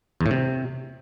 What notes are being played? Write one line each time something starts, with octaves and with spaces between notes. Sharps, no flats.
E2
A2
C3